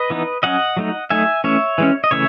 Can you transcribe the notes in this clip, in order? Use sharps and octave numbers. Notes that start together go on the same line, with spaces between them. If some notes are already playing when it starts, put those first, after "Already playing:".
Already playing: B4 D#5
E3 B3 D#4
F#3 C#4 D#5 F#5
F#3 A3 D#4
F#3 A3 D#4 E5 G#5
E3 A3 C#4 C#5 E5
E3 G#3 C#4
D#5
C#3 E3 A3 C#5 E5